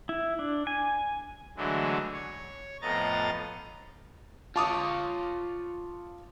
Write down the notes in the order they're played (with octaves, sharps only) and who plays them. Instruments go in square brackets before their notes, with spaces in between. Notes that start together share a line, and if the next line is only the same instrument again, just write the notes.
[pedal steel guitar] E4
D4
G#5
[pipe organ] D3 E3 F#3 G#3 A3
C#5
F2 A2 B3 D#5 A#5 A6
[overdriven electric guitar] F4 C#5 [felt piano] A5 D6 D#6